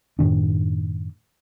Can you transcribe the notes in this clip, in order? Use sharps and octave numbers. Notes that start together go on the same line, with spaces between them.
F#2 A2 D#3 D4